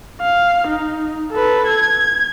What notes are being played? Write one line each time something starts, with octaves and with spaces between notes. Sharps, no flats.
F5
D#4
A4 B4
G#6